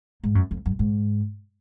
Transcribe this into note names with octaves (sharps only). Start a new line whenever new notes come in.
G#2
F#2
F2
F#2
G#2